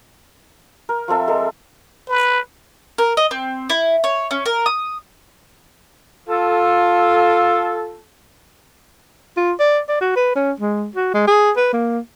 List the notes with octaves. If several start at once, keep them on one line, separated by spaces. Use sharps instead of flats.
A#4
F3 C4 A4 E5
G#3 A4 A#4
B4
A#4
D#5
C4
E4
C#5
C#4
A#4
D#6
F4 A4
F4
D5
D5
F#4
B4
C#4
G#3
F#4
G#3
G#4
B4
A#3